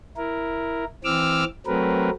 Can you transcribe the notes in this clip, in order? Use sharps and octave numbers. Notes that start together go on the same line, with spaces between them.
E4 A#4
E3 C4 D6 E6 F6
F#3 A3 C4 A#4 B4